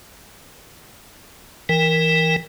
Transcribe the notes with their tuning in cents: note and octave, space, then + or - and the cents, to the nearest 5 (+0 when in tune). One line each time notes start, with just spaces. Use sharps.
E3 +0 A#4 +0 G5 +35